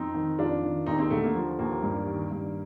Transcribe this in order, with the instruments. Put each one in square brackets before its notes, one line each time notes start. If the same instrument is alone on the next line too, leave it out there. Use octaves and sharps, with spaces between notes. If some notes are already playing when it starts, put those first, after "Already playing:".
Already playing: [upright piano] F2 C4 D#4
D#3
F2 D4 F4
D#3
D#2 C4 D#4
C4 D#4
D3 A3
A#3
F3
D#2 A#3
G2
D#3
G2